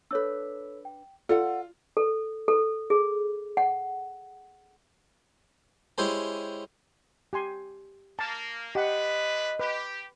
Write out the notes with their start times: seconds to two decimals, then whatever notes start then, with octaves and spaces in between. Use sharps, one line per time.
0.11 D4 A4 B4 C#5 E6
0.85 G5
1.29 F4 A4 D5 F#5
1.97 A4
2.48 A4
2.90 G#4
3.57 F#5
5.98 G#3 C#4 E4 G4 C5 G#5
7.33 G4 G#5 C6
8.19 A#3 A5
8.75 G#3 D4 G4 B4 D#5 F#5
9.59 G4 B4